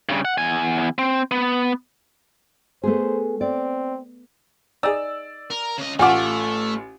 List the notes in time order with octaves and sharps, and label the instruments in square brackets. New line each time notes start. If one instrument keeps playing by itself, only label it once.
[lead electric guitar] G2 C#3
F#5
E2 G#5
C4
B3
[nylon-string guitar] A3 B3 G#4 [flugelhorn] C5
[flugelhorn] C4 [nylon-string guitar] D5
[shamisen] D#4 G#4 [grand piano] D5 E6
[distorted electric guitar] A#4
C#3 D#5
[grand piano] A1 F4 D6 [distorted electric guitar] A3 [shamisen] F#5 G#5